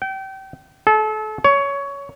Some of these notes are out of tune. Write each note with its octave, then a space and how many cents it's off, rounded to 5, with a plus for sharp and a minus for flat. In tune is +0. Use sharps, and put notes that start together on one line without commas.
G5 -30
A4 -35
C#5 +15